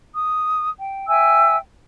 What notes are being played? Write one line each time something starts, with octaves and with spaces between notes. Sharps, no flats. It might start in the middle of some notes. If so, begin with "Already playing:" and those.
D#6
G5
E5 G5 G#5 E6